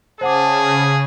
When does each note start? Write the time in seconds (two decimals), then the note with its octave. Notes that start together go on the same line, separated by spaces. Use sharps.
0.21 C#3 G#4 C5 F#5 A5 D6